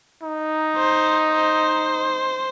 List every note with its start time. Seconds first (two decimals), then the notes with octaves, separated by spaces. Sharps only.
0.22 D#4
0.77 C5
1.32 C5